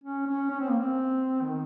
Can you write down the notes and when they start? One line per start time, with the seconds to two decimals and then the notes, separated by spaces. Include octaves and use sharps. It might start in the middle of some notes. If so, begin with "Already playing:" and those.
0.04 C#4
0.27 C#4
0.50 C#4
0.60 C4
0.70 A#3
0.80 C4
1.43 D#3